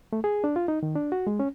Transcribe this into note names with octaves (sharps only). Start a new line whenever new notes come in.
A3
G#4
D4
F4
D#4
D#3
D4
F#4
G#3
C#4